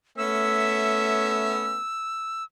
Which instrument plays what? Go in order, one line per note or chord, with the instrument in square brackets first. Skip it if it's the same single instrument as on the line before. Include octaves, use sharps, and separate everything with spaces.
[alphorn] A3 [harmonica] B3 C#4 E5 [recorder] E6